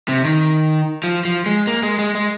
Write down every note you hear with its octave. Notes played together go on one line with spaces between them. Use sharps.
C3
D#3
F3
F3
G#3
A#3
G#3
G#3
G#3